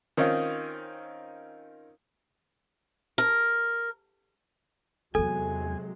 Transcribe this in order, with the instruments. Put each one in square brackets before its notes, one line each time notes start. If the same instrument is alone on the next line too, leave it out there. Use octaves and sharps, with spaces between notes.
[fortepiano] D#3 C4 C#4 D#4 F4
[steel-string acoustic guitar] A#4
[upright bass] E2 E4 [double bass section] C3 F#3 G#3 [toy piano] A4 [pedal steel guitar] G#5